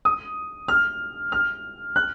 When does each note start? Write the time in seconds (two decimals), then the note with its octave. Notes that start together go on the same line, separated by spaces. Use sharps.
0.05 D#6
0.68 F6
1.32 F6
1.96 F#6